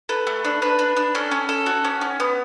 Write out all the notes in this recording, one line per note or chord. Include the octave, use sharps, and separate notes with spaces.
A4 B4
A3
D4
D4 B4
D4
D4
C#4 A4
C#4
A4
F#4
C#4
C#4
B3